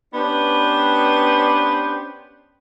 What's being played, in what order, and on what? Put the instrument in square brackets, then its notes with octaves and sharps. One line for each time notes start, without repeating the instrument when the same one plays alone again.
[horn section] B3 C#4 D4 G4 B4 C5